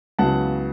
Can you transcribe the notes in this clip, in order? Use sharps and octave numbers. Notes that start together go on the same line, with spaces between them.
C#2 C#3 F#3 B3 E4 F#5 A5